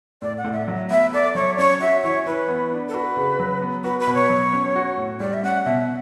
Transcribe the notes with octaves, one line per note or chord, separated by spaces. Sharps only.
A2 D5
F#5
A2
E5
F#3
B3 E5
A4 D5
F#3 C#5
C#4 C#5
F#4 E5
E3 C#5
E3 B4
B3
D4
A4
F#4 B4
C#3
F#3
B3
F#4 B4
B4
B2
C#5
F#3
C#4
F#4
A2
G3 D5
E5
C#4 F#5
B2 E5